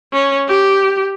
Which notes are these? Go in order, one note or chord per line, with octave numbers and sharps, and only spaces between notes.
C#4
G4